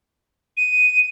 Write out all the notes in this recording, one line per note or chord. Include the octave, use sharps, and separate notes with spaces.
D#7